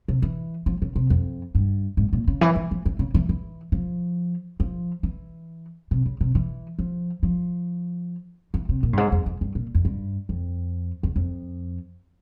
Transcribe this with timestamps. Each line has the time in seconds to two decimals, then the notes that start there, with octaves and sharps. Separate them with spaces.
0.08 C3
0.22 E3
0.66 F3
0.82 C#3
0.96 C3
1.10 F2
1.55 G2
1.97 G#2
2.13 A#2
2.28 C#3
2.41 E3
2.56 E3
2.71 F3
2.86 E3
2.99 C#3
3.14 E3
3.29 E3
3.72 F3
4.60 F3
5.03 E3
5.91 C3
6.06 C#3
6.21 C3
6.35 E3
6.79 F3
7.23 F3
8.54 E3
8.69 C3
8.83 A#2
8.93 G2
8.97 G#2
9.12 F2
9.26 F2
9.41 G2
9.55 A#2
9.75 F2
9.85 G2
10.29 F2
11.03 E2
11.16 F2